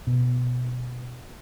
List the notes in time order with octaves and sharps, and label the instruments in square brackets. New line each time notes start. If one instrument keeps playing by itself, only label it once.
[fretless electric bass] B2